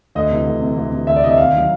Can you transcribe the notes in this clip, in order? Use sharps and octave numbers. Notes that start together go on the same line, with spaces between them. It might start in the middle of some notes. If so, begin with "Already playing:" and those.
D2 D#5
C3 E3
D2
C3 E3
D2
C3 E3
D2 E5
D5
C3 E3 D#5
E5
D#2 F5
D#3 F#3